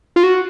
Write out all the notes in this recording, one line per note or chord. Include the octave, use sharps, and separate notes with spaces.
F4
F#4